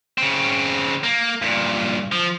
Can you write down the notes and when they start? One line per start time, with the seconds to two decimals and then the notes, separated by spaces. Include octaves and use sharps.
0.18 C#3 C4
1.04 A#3
1.42 G2 A#2
2.12 F3